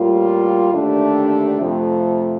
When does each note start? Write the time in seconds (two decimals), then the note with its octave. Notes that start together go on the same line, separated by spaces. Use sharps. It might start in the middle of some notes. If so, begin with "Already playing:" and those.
Already playing: A2 G3 A#3 F4
0.72 D#2 D3 A3 D4 G4
1.60 F2 C3 F3 A3